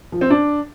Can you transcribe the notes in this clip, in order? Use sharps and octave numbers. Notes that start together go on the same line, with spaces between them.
F3
C4
D4